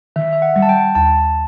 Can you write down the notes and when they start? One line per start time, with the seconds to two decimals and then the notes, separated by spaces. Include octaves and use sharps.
0.16 D#3 E5
0.33 E5
0.42 F#5
0.56 G3
0.62 A5
0.69 G5
0.95 D#2 A5